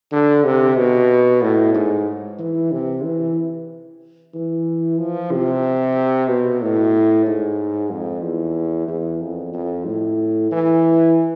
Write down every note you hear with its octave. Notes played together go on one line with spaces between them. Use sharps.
D3
C3
B2
A2
G#2
E3
C3
E3
E3
F3
C3
B2
A2
G#2
F2
E2
E2
F2
F2
A2
E3